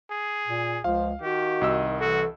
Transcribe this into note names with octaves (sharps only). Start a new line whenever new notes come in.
G#4
A#2
C#2 F3 F5
D#3 F#4 G4
C2 D#5 E6
E3 F#4 A4